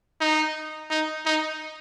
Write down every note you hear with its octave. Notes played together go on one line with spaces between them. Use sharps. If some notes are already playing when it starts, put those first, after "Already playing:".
D#4
D#4
D#4